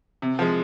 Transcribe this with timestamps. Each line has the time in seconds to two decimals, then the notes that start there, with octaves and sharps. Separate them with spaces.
0.22 C3
0.39 F3 G#3